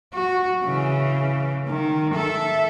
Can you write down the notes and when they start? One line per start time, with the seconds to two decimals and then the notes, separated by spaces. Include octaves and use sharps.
0.14 F#4
0.64 C#3 E3
1.67 D#3
2.14 A4 E5